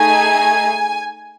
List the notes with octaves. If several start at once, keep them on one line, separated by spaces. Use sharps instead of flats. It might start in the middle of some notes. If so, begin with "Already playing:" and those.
Already playing: A3 D#4 G#4 G#5